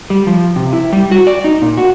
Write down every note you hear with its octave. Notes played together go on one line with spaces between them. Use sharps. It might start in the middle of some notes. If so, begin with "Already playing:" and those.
G3
F3
C3
E4
G3
F#4
D5
D#4
A#2
F#4